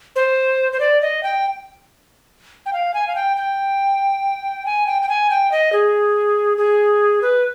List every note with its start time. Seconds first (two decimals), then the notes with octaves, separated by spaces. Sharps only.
0.16 C5
0.73 C5
0.80 D5
1.01 D#5
1.23 G5
2.66 G5
2.73 F5
2.94 G#5
3.07 F5
3.15 G5
3.37 G5
4.66 G#5
4.87 G5
5.02 G5
5.09 G#5
5.30 G5
5.52 D#5
5.73 G#4
6.58 G#4
7.22 B4